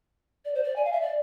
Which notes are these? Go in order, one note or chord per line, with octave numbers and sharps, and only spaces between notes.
D5
C5
D5
G#5
F5
E5
D5